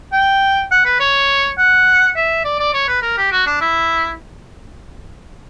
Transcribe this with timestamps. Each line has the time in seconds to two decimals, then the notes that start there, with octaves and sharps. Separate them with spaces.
0.13 G5
0.71 F#5
0.85 B4
1.00 C#5
1.58 F#5
2.16 E5
2.45 D5
2.60 D5
2.73 C#5
2.88 B4
3.02 A#4
3.17 G4
3.32 F#4
3.46 D4
3.61 E4